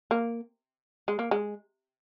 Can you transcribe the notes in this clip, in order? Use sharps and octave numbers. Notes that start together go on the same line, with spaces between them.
A#3
G#3
A#3
G#3